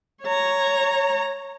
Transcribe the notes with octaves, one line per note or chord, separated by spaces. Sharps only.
C#5 A#5